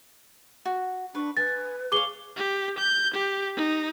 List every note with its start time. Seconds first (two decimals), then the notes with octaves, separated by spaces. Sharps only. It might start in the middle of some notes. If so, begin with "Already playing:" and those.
0.65 F#4
1.15 D4 B4 C#6
1.37 B4 G#5 A6
1.92 G#4 C#5 F5 D6 G7
2.36 G4
2.78 G6
3.14 G4
3.57 D#4